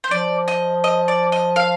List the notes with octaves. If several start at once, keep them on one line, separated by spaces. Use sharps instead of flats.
C5
F3 D5
D#5
D#5
D5
D#5
F5